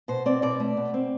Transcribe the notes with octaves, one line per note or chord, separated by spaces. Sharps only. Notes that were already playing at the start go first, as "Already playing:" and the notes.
B2 C5
C4 D5
B2 D5
A3
B2
C4